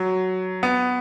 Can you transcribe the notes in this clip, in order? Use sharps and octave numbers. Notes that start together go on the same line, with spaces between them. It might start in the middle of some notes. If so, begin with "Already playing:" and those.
Already playing: F#3
B3